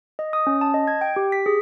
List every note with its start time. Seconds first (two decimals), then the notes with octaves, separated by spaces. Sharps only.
0.19 D#5
0.33 D#6
0.47 C#4
0.61 A5
0.74 D#5
0.88 G#6
1.01 G5
1.16 G4
1.32 B6
1.46 G#4